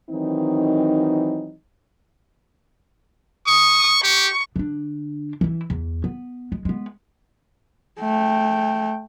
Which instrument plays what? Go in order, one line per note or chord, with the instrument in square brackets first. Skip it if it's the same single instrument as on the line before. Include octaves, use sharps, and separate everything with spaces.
[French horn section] D#3 E3 F#3 C4 D#4
[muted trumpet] C#6 [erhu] D#6
[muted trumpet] G4 [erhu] C#6
[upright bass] D3 D4
E3 E4
E2
B3
G#3
G#3 B3
[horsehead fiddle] A3 G5